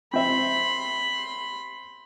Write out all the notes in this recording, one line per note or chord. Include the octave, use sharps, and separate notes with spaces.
C4 E5 B5 C6